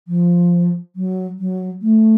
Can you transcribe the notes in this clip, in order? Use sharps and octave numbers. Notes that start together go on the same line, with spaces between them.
F3
F#3
F#3
A3